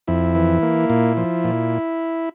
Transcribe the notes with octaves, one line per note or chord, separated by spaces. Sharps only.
F2 E4
E3
A#3
A#2
F3
A#2